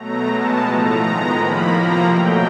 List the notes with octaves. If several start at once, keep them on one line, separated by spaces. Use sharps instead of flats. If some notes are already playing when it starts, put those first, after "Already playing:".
Already playing: B2 F#3 A3 A#5
B2 G#3 B3 A5
A2 F3 A3 A#5
D#3 G#3 B3 A#5
A2 F3 A#3 B5
C3 F3 A#3 A#5
B2 F#3 A3 G5